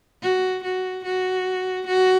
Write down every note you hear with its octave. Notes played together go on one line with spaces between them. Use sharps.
F#4
F#4
F#4
F#4